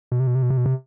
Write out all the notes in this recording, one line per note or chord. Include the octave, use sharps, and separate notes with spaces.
B2
C3
B2
C3
B2
C3
B2
C3